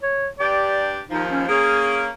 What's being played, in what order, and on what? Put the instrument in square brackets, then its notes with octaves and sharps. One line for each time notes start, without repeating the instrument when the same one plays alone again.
[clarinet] C#5
[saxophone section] G2 D4 G4 [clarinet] D5
[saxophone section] D#2 F3 [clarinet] D#4
[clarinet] C#4
[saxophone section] A#3 C#4 [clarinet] G#4